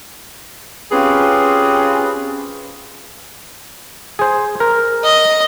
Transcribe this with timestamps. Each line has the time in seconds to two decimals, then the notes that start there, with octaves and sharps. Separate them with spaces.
0.92 C4 C#4 F4 G4 G#4 B4
4.19 G#4 C5
4.60 A#4
5.04 D#5